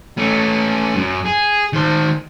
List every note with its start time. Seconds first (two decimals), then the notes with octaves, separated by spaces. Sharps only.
0.18 A3 C#4
0.96 F#2
1.26 G#4
1.73 D#3 C5